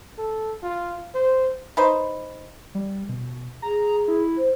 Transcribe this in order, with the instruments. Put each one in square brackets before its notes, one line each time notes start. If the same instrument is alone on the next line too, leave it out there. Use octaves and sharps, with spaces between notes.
[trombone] A4
F4
C5
[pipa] D#4 B4 C5
[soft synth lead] G3
B2
[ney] G#4 [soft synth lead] A#5
[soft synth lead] E4
[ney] C5